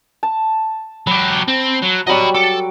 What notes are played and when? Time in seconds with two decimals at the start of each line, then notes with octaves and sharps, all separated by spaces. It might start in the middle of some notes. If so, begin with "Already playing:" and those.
0.23 A5
1.07 F#3 G4 B5
1.48 C4
1.82 F#3
2.07 F#3 G3 F#4 D#5 B5
2.34 A4 D6